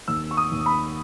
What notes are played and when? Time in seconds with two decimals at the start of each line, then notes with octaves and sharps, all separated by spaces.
0.08 D#2 E6
0.31 C#6
0.37 D#6
0.52 D#2
0.66 B5